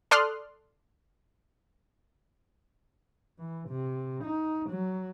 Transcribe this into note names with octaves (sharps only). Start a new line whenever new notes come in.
A4 D5 C6 D#6 F6 F#6
E3
C3
D#4
F#3